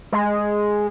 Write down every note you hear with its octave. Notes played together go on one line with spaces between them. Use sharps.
G#3